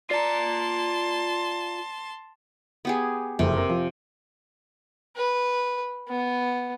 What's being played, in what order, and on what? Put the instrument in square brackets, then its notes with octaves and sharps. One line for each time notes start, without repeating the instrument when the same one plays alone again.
[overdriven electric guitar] F4 A#5 [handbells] D5 C7 [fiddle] A5 C6
[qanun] B3 G4 G#4
[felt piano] F#1 F2 [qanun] C3
[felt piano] A#4
F3
[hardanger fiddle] B4
B3